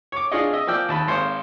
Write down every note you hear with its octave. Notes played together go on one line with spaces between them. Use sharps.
C#5 D6
D4 F4 G#4 C#5 D#5
D#5 E5
F3 A#3 D5 G5 E6
D#2 A5 B5
G#1 A#3 C5 C#5